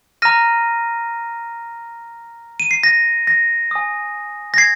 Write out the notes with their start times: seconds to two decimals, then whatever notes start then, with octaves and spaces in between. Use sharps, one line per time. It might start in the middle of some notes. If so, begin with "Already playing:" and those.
0.22 A#5 F6 A#6 D#7
2.60 D#7
2.71 C7
2.83 A#6
3.27 A#6
3.71 G#5 D#6
4.54 A#6
4.58 G#6 C7